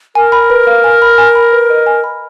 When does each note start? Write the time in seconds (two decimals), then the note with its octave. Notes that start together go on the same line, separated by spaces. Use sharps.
0.15 A#4 G#5
0.32 B5
0.50 B4
0.67 F5
0.84 G#5
1.02 B5
1.18 G#5
1.35 B5
1.52 B4
1.70 D#5
1.86 G#5
2.04 B5